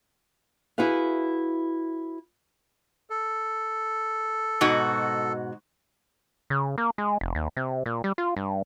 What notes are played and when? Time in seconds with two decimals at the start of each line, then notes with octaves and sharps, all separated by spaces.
0.78 E4 F#4 G#4 B4 F5
3.10 A4
4.61 G#2 B2 F#4
6.50 C#3
6.78 A#3
6.98 G#3
7.21 F1
7.35 D#2
7.57 C3
7.86 A#2
8.04 G3
8.18 F4
8.37 G2